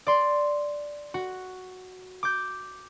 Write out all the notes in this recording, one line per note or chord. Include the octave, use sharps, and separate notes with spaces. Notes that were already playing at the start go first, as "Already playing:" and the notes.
D5 C6
F#4
D6 G6